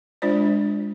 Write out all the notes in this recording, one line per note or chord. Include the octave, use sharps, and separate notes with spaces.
G#3 D4 F4 C5 D5